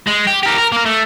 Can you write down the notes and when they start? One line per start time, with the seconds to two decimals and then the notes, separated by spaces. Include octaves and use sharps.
0.07 G#3
0.27 G4
0.43 G4 A#4
0.58 A#4
0.72 A#3 A#4
0.86 A3